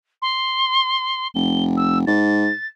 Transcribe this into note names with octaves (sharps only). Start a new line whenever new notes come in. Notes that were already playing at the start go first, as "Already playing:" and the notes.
C6
F1 G7
E6
G#2 A6